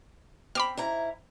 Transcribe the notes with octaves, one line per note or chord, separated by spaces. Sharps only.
C4 B5 D6 F6
G#2 E4 A#5